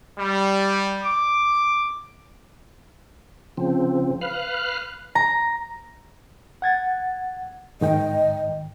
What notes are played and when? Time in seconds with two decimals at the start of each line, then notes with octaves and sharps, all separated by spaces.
0.17 G3
1.04 D6
3.57 C#3 F3 C4
4.21 B4 F5 F6 F#6
5.15 A#5
6.62 F#5 G#6 A6
7.81 G#2 D#3 D#5 G5